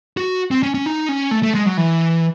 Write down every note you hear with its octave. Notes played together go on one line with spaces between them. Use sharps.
F#4
C4
C#4
C#4
D#4
C#4
A3
A3
G#3
F#3
E3